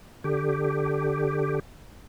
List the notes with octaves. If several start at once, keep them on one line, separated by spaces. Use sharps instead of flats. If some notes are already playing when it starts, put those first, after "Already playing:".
D3 G4